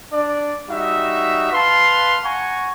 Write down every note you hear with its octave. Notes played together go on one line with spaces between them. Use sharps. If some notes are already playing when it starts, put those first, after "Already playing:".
D4 D5
G3 D#4 F#4 E5
B4 F5 A5 C6
F#5 G#5 A#5 C#6